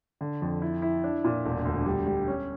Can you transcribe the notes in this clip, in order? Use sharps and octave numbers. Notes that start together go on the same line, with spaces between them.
D3
F2
E4
E4
D4
A#2
E1
D2
G3
G3
C#4